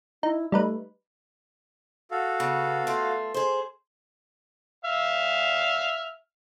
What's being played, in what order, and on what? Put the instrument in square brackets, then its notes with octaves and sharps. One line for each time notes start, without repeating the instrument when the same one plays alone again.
[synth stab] D#4 [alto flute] E4
[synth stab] G3 D#4 B4 [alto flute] A3
[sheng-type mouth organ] F#4 A4 F5
[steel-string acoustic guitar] C#3 B3
A3 F4
G#4 C5
[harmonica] E5 F5 F6